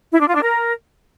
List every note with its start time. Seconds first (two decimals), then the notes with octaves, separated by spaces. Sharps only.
0.12 E4
0.20 D4
0.28 F4
0.35 D4
0.43 A#4